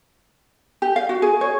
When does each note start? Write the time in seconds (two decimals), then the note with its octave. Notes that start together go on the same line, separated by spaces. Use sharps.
0.82 G4
0.96 F5
1.09 F#4
1.22 G#4
1.41 C#5